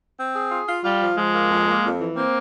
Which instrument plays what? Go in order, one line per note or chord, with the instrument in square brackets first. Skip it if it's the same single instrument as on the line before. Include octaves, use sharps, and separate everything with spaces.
[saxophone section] C4
G#4
F4
F4
[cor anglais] G3 [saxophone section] F4
[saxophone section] F3
[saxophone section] F3 [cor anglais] G#3
[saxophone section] A#3
F2
A#3
F2
E3
[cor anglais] A#3 [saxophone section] C4